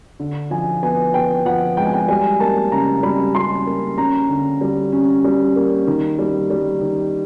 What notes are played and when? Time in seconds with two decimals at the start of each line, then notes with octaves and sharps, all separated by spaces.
0.20 D3
0.51 F3 G#5
0.83 B3 G#5
1.14 B3 G5
1.46 F3 F#5
1.77 G#3 G5
1.86 G#5
1.93 G5
2.08 G3 G#5
2.40 A#3 A5
2.72 C#3 A#5
3.03 G3 B5
3.35 G3 C6
3.66 A#3
3.98 C#4 A#5
4.29 D3
4.61 G3
4.93 C#4
5.24 G3
5.56 A#3
5.87 D#3
6.19 G3
6.50 G3
6.81 D#3